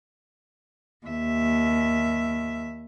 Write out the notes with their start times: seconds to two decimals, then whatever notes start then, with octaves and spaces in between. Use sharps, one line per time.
1.07 D#2 E5